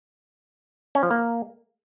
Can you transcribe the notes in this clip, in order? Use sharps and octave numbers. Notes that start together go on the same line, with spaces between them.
C#4
F3
A#3